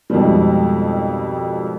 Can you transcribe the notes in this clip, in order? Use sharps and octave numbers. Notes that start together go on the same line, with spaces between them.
F2 G#2 B2 D#3 F3 G3